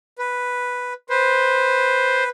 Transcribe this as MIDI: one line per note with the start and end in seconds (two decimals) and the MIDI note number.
0.19 0.93 71
1.10 2.29 71
1.10 2.24 72